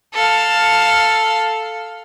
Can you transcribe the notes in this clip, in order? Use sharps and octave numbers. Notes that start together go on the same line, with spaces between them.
A4 F5